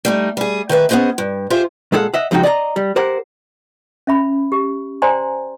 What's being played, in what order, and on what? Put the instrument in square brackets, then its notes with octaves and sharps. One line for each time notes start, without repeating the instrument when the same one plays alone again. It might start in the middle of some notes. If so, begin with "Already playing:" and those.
[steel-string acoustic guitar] G3 A3 D#4
G3 G#4
D#3 G#4 B4 E5
B3 C#4 F4 G#4 C5 D#5
G2
F4 G4 G#4 C5 E5
[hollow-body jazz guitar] A#2 G#3 A4 F5 F#5
D#5 E5 F#5
C#2 F3 G#3 D#4 F#4 G5
D5 D#5 G#5 A#5
G3
G4 A#4 C5 F#5
[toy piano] C#4 E5 B5
G4
C5 D5 G5 G#5 A#5 C6